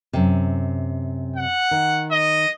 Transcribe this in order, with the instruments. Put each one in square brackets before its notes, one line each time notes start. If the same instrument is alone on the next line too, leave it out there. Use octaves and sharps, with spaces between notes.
[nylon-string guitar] F#2 C3
[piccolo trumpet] F#5
[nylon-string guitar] D#3
[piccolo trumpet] D#5